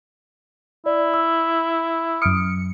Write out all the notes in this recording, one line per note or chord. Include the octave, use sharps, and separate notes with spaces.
E4 D5
E6
F#2 D#6 F6 C#7 D7